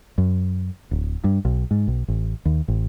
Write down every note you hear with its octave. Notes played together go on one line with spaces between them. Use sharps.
F#2
D1
G2
B1
G#2
B1
A1
D#2
A1